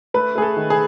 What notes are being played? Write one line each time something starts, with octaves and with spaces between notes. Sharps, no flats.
A3 B4
A3 G#4
A4
D#3
G#4